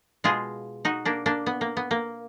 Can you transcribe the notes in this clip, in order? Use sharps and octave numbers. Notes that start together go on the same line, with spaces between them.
B2 G#3 F4 G#4
D#4 F#4
A#3 D4
A#3 D4
B3
A#3
B3
A#3